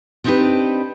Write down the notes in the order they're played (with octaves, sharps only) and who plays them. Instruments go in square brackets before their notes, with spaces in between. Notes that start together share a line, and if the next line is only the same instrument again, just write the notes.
[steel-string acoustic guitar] B3 C4 D4 D#4 G4 B4